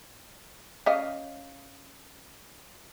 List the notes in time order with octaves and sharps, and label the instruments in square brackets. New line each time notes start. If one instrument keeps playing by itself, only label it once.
[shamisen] C#4 D#5 F5